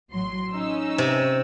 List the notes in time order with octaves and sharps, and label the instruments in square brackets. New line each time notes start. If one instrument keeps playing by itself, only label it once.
[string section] A1 F#3 C6
C#4 D#4 E6
[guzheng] C3